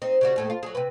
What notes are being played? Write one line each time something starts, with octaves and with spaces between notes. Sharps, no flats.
C4 D#4
C#3 G3 F#4
D#2 A2 A3
F4
F#3 G#4
C3 B4